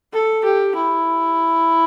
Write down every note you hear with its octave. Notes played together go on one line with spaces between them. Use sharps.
A4
G4
E4